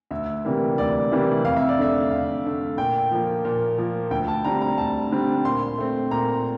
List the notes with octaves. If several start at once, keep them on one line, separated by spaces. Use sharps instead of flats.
D2 E5
C3 E3 G3 A#3
D2 D5
C3 E3 G3 A#3
F2 F5
E5
D5
D3 A3 E5
F2 F5
D3 A3
A#2 G5
F3 A#3
A#2
F3 A#3
D2 G5
A5
D3 G3 C4 A#5
A#5
D2 A5
D3 G3 C4
A#2 C6
A3 C4
A#2 A#5